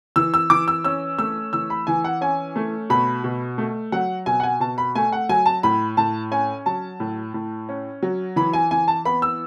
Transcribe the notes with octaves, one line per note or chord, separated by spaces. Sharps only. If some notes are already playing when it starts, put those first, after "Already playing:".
E3 E6
E6
E3 D6
E6
C#4 E6
A3 E6
E3 E6
B5
E3 G#5
F#5
C#4 G#5
A3
B2 B5
B2
A3
F#3 F#5
B2 G#5
F#5
G#5
B2 A5
B5
A3 G#5
F#5
F#3 G#5
A5
A2 B5
A2 A5
C#4 G#5
F#3 A5
A2
A2
C#4
F#3
E3 B5
G#5
E3 G#5
A5
B3 B5
E6